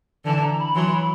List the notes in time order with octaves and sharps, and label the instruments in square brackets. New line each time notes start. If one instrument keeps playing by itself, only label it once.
[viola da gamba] D3 E3 [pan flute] A5
[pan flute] A#5
B5
[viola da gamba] E3 F#3 [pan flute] C6
[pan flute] B5